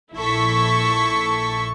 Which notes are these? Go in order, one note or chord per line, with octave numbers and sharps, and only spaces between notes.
A#1 E4 A4 A5 C#6 B6